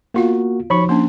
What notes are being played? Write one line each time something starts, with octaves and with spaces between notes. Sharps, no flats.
A#3 B3 F4 F#4 F5
F3 D#4 F#4 C#5 B5 C#6
A#3 C#4 D4 C6